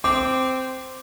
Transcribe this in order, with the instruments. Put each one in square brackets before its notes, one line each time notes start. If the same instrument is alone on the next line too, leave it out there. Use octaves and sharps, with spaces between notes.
[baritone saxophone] C4 [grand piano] D6